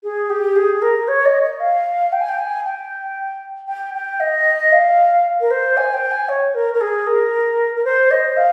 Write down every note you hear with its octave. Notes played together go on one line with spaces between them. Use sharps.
G#4
G4
G#4
A#4
C#5
D#5
D#5
F5
G5
G#5
G5
G#5
G5
G5
G5
D#5
F5
A#4
C5
G#5
G5
G#5
C#5
A#4
A#4
G#4
A#4
A#4
C5
D#5
F5